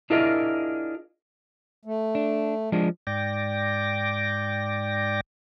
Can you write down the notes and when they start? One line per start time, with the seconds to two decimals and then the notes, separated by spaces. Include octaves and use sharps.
0.10 D4 E4 F4 G#4 A#4 D#5
1.85 A3
2.15 D4
2.72 F3 G#3 D4
3.07 G#2 D5 G5 D6 A#6